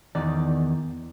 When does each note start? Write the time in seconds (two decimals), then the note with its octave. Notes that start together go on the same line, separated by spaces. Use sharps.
0.15 E2 D#3 D5